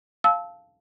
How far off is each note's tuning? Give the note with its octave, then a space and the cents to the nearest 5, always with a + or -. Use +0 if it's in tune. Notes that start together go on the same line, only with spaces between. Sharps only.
F5 +0 A5 -15 E6 -20